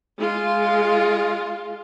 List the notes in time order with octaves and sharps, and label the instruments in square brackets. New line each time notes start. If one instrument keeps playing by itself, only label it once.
[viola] G#3 F4